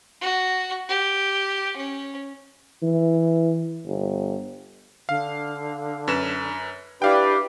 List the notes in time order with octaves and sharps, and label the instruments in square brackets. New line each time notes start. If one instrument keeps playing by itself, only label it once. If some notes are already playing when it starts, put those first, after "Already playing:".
[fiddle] F#4
G4
C#4
[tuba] E3
G1
[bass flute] D3 [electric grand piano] F5
[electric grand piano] F#2 B4 E7
[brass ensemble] D4 B4 D5 [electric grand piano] E4 F5 G5 [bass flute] G4